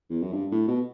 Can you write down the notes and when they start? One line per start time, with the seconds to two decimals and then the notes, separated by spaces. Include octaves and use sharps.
0.10 E2
0.22 F#2
0.33 G2
0.52 A2
0.68 B2